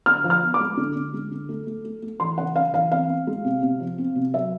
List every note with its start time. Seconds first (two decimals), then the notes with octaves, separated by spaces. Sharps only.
0.06 D3 F6
0.24 F3
0.30 F6
0.42 B3
0.54 D6
0.60 G#3
0.77 D3
0.96 D3
1.13 G#3
1.31 D3
1.49 A3
1.67 A3
1.84 A3
2.02 A3
2.20 E3 C6
2.38 C#3 F#5
2.56 C#3 F5
2.73 E3 F5
2.92 C4 F5
3.09 C4
3.27 G#3
3.45 C3
3.63 C3
3.80 F3
3.98 C4
4.16 C3
4.34 F#3 E5